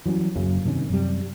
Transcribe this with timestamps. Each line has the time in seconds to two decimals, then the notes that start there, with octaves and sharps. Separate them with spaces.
0.06 E3 F#3 G3 C#4
0.36 F#1 F#2 C#3
0.65 G2 C3 D#3 C#4
0.89 F#2 C3 G3